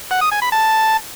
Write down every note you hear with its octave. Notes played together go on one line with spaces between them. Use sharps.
F#5
D#6
G#5
B5
A5